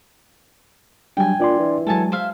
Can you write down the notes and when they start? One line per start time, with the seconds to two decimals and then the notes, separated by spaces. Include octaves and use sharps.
1.17 F#3 G3 D4 G5 G#5
1.40 A#2 D4 D5 C6
1.59 E3
1.87 F#3 G#3 A4 G#5 A5
2.12 C5 E5 F5